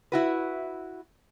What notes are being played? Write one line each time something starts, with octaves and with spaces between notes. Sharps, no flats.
E4 F#4 B4